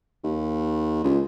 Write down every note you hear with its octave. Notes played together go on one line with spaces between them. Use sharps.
D#2
C#2